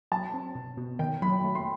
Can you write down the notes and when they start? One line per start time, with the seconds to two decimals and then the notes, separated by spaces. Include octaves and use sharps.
0.12 F#3 A5
0.34 C4
0.55 B2
0.77 B2
0.99 D#3 G5
1.22 F#3 B5
1.44 A3
1.55 C6